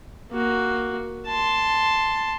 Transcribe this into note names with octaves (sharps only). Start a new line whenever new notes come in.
A#3 F#4
A5 C6